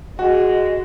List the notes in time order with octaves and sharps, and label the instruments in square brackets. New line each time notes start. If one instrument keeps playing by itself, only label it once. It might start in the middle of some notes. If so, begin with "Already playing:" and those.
[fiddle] G#3 [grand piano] F#4